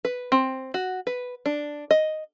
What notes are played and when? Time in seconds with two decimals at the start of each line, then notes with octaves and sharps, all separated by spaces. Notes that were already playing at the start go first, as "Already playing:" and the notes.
0.05 B4
0.32 C4
0.74 F#4
1.07 B4
1.46 D4
1.91 D#5